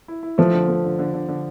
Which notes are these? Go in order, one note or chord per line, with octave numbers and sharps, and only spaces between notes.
E4
E4
F3 A3
D3
A3
D3
D3
D3
D3